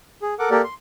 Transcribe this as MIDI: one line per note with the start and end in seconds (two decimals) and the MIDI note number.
0.22 0.34 68
0.39 0.50 69
0.39 0.50 70
0.39 0.50 78
0.39 0.50 86
0.51 0.62 58
0.51 0.62 67
0.51 0.62 69
0.51 0.62 70
0.51 0.62 74
0.64 0.74 84